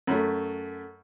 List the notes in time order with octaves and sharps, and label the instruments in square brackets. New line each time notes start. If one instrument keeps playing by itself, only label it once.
[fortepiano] F#2 A3